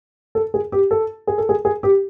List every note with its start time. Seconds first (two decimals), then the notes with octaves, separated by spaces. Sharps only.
0.35 A4
0.54 G#4
0.72 G4
0.91 A4
1.27 G#4
1.38 A4
1.49 G#4
1.65 G#4
1.83 G4